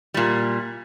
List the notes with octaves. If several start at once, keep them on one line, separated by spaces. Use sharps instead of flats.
A#2 G3